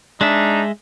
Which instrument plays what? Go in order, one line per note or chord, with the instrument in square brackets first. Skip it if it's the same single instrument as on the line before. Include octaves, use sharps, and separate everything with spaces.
[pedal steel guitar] G#3 E5 [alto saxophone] D4 [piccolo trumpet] D#4